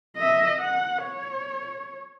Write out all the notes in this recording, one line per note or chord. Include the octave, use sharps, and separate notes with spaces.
D#5 E5
F#5
C#5